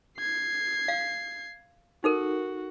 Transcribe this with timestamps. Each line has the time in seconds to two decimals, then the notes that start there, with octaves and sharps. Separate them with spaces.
0.19 G#6 C7
0.88 F5
2.04 D#4 F#4 A4 A#4